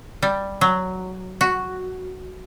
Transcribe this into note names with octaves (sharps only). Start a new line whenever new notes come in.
G3
F#3
F#4